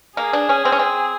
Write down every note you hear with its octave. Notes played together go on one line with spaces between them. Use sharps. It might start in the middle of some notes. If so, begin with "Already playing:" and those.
A#3 G#4
D4
C#4
C4
C#4
C4